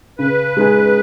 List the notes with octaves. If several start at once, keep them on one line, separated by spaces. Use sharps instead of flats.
C#3 B4
G#3 D#4 G#4